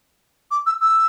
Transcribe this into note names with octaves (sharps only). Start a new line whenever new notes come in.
D6
E6
E6